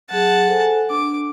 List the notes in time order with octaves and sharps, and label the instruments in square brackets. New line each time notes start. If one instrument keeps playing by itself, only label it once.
[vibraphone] F#3 G#4 [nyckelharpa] F#5 A5
[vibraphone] A4 C5 G#5
[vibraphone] D4 [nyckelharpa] D6